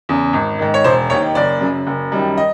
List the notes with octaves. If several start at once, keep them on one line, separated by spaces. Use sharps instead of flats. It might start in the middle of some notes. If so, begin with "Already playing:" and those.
E2 C#3
G#1
G#2 D#3
C#5
E1 C5
D#2 D#3 C#5
F#1 D5
F#2 C#3
F#1
F#2 D#3 G3
D#5